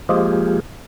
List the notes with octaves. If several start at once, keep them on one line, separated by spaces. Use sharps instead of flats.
F3 G#3 A#3 F4 G4 G#4